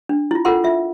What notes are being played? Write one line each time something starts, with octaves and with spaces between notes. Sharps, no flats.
D4
E4 F4
F4 A4 A#4 F#5 G5 C6
F4 E5